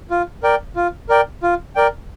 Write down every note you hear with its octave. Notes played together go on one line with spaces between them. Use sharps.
F4
A#4 D5 G5
F4
A#4 D5 G5
F4
A#4 D5 G5